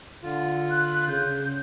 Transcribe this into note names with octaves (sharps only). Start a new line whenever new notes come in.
D3 F4
F#6
C#3 G6